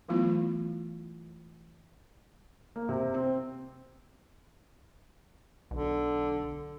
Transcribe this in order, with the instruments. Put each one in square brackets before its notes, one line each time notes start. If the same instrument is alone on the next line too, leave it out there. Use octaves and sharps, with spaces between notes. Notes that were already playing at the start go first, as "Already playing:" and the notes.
[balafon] E3 F#3 A3 B3 E4 F4
[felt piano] A#3
C3
C4
[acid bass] B1 [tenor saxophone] D3